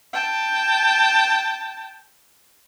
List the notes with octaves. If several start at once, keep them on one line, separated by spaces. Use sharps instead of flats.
G5 A5